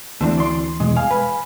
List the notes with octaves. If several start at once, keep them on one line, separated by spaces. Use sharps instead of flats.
D2 E3 A3 C4 D4
D5 C6
E2 B2 G#3
F5 G#5
B4